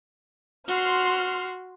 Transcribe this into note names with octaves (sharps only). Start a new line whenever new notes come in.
F#4 C6 F6